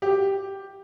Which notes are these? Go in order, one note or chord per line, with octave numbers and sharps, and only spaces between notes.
G4